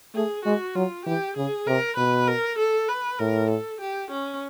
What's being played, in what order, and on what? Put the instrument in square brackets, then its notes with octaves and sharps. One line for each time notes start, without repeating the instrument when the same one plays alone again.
[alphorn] A3 [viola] G#4
[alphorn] G#3 [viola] F#4
[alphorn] F#3 [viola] F4
[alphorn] E3 [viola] G4
[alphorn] C#3 [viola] G#4
[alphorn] C3 [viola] A#4
[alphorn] B2 [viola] B4
[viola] A#4
A4
B4
[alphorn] A2 [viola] A#4
[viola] A4
G4
C#4